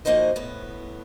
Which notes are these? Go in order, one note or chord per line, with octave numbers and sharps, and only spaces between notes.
F3 A#3 D#4 F#4 C5 D#5
A2 B3